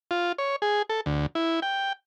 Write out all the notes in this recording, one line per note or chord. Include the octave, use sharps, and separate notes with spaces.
F4
C#5
G#4
A4
D2
E4
G5